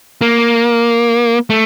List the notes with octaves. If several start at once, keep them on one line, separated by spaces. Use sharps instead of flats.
A#3
A3